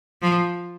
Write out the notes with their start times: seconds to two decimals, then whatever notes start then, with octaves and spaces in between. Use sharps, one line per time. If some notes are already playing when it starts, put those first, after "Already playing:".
0.22 F3